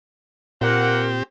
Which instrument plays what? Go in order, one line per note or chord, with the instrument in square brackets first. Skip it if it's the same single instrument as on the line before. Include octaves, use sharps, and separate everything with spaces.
[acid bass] A#2 [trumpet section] A#3 F#5 [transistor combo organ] C4 G4 [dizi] A#4